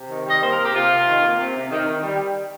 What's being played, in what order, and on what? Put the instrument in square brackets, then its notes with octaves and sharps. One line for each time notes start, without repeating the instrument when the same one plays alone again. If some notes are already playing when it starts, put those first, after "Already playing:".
Already playing: [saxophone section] C3
D#3
G3 D#5
A#3 C5
A#4
C3
G4
C3 F4
C3
D#3
A#3
C3
C3
D#3
D#3
G3